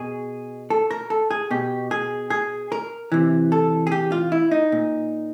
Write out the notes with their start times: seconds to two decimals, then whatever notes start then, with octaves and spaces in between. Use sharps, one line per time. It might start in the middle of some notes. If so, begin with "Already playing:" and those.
Already playing: B2 G#4
0.70 A4
0.91 A#4
1.10 A4
1.31 G#4
1.51 B2 G4
1.91 G#4
2.30 G#4
2.72 A#4
3.12 C3 E3
3.52 A4
3.87 G#4
3.92 G4
4.12 F4
4.32 E4
4.51 D#4
4.72 A#2